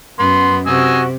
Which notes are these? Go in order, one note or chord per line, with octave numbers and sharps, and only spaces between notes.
F#2 B3 C6
C3 F#4 D#5 G#5 E6